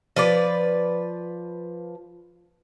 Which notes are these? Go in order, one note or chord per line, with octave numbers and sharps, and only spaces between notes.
F3 B4 D5